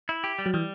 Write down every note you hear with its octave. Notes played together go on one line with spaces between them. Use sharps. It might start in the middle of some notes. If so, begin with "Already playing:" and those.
E4
G4
G3
F#3
E3 G3